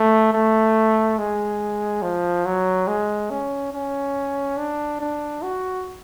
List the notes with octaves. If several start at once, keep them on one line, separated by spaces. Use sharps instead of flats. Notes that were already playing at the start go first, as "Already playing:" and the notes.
Already playing: A3
A3
G#3
F3
F#3
G#3
C#4
C#4
D4
D4
F#4